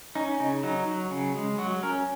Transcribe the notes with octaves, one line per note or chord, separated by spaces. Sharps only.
C#4 D#4
C#3 D#4
F#3 D#4
F#3
C#3
G#3
F#3 F#4
C#4 A#4